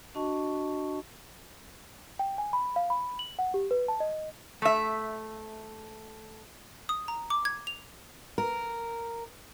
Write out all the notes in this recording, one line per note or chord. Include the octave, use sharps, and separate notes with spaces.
D4 F#4 D#5 A5 C#6
G5
G#5
B5
F5
B5
F#7
F#5
G4
B4
A5
D#5
A3 E5
D#6
A#5
D6
G#6
F7
A#4